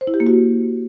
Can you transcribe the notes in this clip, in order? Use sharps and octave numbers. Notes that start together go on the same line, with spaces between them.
C5
E4
G4
A#3
F#4